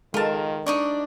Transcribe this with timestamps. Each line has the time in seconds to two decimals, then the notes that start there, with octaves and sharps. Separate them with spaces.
0.14 D#3 G#3 F4 A4 A#4 A5
0.66 D4 D#4 D5 C#6